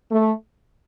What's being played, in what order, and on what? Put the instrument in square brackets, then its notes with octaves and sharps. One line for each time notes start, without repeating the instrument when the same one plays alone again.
[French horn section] A3